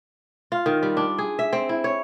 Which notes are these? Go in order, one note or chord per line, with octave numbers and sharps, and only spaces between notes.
F4
D#3
G3
D4
G#4
E5
C4
E4
C#5